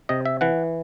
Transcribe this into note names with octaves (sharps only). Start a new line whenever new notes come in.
C3 D#5
E5
E3 F#5